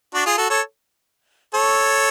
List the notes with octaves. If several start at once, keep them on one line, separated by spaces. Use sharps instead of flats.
D4 F#4
F4 G#4
F#4 A4
A4 C#5
A4 C#5